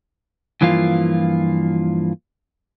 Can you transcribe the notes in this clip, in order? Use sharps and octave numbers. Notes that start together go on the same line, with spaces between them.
G2 E3 F3 A#3 F4